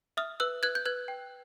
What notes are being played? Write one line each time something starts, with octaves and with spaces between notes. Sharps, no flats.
E5 D#6 F6
B4 E6 F#6
B4 F#6 G#6
G6
B4 F#6 G#6
G5